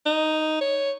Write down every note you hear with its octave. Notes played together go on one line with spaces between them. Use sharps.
D#4
C#5